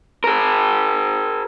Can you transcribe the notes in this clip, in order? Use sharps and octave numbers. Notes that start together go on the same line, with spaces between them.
G#4 A#4